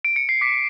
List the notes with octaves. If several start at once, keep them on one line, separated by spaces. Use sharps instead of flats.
D7
C#7
C7
D6 B6